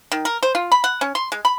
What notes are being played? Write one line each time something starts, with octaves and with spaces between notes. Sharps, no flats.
D#3
A#4
C5
F4
B5
F#5
C#4
C6
G#3
B5